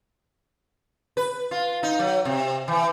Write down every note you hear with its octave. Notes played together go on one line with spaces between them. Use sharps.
B4
F4
D#4
F#3
C3
E3